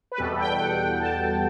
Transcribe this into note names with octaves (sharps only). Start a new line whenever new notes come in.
B4
E2 B2 G3 A4
G5
G5
F#5
A5